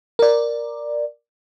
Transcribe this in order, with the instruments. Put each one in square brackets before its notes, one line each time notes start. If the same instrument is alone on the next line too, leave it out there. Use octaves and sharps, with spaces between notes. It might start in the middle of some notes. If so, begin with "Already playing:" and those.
[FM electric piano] A#4 D5